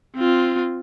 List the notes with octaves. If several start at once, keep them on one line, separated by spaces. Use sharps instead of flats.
C4 F4